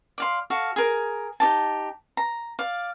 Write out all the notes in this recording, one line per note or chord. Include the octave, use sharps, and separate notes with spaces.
D5 F5 C6
F#4 A4 F5
G#4 A#4
D#4 G4 A5
A#5
D5 F5